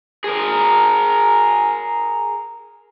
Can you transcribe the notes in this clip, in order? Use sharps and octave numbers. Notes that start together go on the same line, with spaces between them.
G#4 A#4